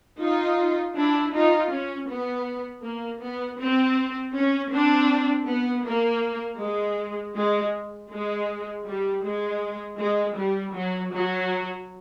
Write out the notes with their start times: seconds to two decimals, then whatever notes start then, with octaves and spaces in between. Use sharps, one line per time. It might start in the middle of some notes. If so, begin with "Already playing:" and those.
0.21 D#4 F4
0.96 D4 E4
1.34 D#4 F4
1.71 C#4
2.09 B3
2.84 A#3
3.22 B3
3.60 C4
4.35 C#4
4.72 C4 D4
5.48 B3
5.85 A#3
6.61 G#3
7.36 G#3
8.11 G#3
8.87 G3
9.24 G#3
9.99 G#3
10.37 G3
10.74 F#3
11.12 F#3